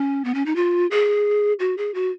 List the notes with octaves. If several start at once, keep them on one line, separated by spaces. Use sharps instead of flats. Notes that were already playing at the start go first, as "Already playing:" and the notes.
Already playing: C#4
B3
C#4
D#4
F4
G#4
F#4
G#4
F#4